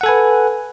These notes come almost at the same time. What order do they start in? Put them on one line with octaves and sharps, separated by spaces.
F#5 A4 G#5 B4